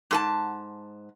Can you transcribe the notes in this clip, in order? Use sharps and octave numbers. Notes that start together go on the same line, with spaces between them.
G#2 A4 A5